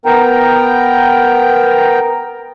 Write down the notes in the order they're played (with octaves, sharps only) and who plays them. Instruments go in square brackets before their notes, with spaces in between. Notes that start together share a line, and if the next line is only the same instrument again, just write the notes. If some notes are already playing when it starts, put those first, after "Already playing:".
[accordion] B3 A#4 G5 A#5